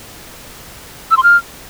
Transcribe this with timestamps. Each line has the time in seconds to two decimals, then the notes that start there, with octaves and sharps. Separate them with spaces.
1.11 E6
1.17 C6
1.23 F6